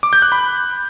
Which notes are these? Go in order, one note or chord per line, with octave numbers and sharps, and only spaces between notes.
D6
G6
F#6
B5